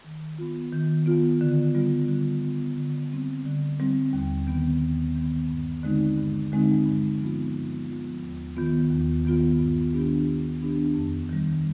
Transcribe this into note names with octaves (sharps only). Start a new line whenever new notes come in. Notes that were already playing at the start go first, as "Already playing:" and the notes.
D#3
B3 F4
D#3
B3 F4
D3
G3 B3 F4
D3
G3 B3 F4
D3
G3 C4
D3
G3 C4
D#2
D#3 B3
D#2
D#3 B3
G2
D3 G#3 C4 D#4
G2
D3 G#3 C4 D#4
G2
F3 B3 F4
G2
F3 B3 F4
D#2
D#3 B3 F4
D#2
D#3 B3 F4
G2
D#3 B3 D4 G4
G2
D#3 B3 D4 G4
F2
D#3 G3